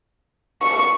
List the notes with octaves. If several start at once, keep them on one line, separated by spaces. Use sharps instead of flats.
C#6